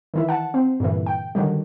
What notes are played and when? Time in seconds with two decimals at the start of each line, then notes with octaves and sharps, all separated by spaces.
0.14 D#3 E3 E4
0.29 F#5 A5
0.54 C4
0.80 G2 A#2 D3 E3
1.06 G5
1.35 D3 D#3 F#3 G3